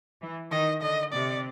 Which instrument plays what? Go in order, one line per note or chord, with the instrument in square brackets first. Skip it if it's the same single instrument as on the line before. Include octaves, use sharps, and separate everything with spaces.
[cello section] E3
[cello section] D#3 [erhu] D#5
[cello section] D3 [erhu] D#5
[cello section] C3 [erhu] D5